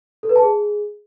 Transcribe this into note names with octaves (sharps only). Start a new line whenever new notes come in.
A4
B4
A5
G#4